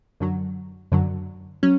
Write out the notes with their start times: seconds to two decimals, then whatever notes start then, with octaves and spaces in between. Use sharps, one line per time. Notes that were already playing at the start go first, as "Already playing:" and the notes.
0.20 F#2 D3 F#3
0.92 F#2 D3 F#3
1.63 F#3 C#4